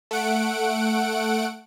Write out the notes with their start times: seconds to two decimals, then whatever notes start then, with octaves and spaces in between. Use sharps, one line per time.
0.11 A3 F#5 D7